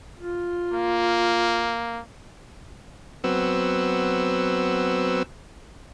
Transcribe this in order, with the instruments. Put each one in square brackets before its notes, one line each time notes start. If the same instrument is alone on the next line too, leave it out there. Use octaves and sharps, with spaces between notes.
[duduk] F4
[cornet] A#3
[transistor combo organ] F#3 B3 C4 E6